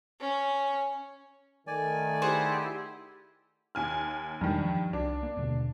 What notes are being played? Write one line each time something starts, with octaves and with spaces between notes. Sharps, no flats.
C#4
D#3 A3 D5 G#5
E4 G4 G#4 C5 F#5
D#2 G#5 F6
E2 G2 D#3 E3 G#3
F3
C2 D4
A#3
D#2 B2 D3